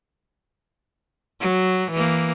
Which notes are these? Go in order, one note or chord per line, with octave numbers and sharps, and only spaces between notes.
F#3
E3 A#3